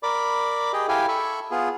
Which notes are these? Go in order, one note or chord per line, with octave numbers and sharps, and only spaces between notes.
A#4 D5 B5 D6
G4 G#4 D#5 G5
E4 G4 A4 F5 G5 G#5
A4 E5 B5 C#6
B3 F4 G#4